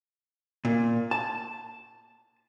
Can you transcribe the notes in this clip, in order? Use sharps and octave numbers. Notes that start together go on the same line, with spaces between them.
A#2
A5